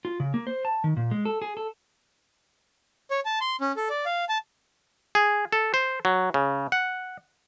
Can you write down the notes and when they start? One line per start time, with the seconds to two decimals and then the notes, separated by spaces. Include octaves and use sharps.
0.05 F4
0.20 C#3
0.34 A#3
0.47 C5
0.65 A5
0.84 D#3
0.97 A#2
1.11 G#3
1.25 A4
1.42 G#4
1.57 A4
3.11 C#5
3.25 A5
3.41 C6
3.61 C#4
3.76 A4
3.89 D5
4.06 F5
4.29 A5
5.15 G#4
5.52 A4
5.74 C5
6.05 F#3
6.34 C#3
6.72 F#5